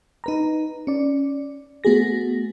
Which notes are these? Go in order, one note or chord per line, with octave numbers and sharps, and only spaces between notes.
D#4 B4 A#5
C#4 D5
A3 B3 F#4 G#4 A#6